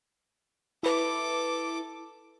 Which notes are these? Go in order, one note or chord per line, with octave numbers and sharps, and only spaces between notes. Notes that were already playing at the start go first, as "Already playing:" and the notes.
E4 A4 B4 D6